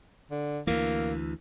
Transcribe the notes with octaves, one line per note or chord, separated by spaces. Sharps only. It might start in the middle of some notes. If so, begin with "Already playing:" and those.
D3
D2 E3 A#3